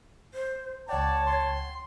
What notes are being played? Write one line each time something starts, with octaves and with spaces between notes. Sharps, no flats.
C5
C#2 C#5 D5 F#5 G5 A5
C6